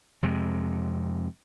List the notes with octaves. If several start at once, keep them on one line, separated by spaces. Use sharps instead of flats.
F2 C3 G#3